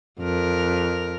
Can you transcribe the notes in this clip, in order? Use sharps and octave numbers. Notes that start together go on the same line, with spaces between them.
F2 A#4